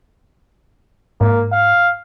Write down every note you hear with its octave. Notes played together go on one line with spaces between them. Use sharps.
G#2 A#3
F5